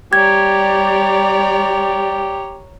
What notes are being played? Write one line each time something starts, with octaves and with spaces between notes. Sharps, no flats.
G3 G4 C#5 D5 A#5 G#6